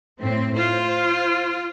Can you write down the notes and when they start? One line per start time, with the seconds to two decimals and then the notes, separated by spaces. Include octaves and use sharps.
0.20 A2 C4
0.57 F4 C5